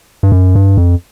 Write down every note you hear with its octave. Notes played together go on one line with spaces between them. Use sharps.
G2
F#2
G2
F2